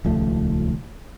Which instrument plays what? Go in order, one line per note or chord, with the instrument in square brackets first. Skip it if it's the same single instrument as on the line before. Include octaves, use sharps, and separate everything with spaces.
[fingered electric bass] D#1 C#2 F3 A3